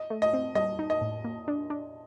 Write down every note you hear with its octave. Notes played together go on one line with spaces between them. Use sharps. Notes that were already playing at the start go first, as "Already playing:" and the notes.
Already playing: D#5
A3
D#5
C4
G3 D#5
D#4
D#5
A2
A#3
D4
D4